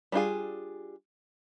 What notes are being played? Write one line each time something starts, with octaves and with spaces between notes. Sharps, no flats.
G3 D4 F4 G#4